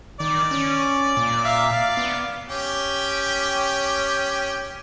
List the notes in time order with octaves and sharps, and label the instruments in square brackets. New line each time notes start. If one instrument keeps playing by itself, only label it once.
[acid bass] D#3 [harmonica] D5
[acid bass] C#4
A#2
[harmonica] E5 F5
D5 F5
[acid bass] B3
[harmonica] C#4 G4 G5